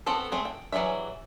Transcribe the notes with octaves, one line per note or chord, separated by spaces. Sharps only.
B3 C4 F#4 A4 C5
A3 C4 G#4
G5
E3 F#3 G3 G#4 E5